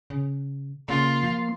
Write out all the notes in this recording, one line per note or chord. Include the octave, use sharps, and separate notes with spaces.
C#3
C#3 A#3 F4 C6
F3